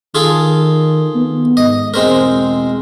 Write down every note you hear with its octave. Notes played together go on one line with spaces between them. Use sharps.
D#3 F4 G#4 A4
B3
G#2 D#5
E1 G#3 C4 A#4